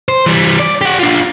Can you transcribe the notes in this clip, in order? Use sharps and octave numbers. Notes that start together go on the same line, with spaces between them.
C5
E3 G3
D5
G4 F#5
D4 F4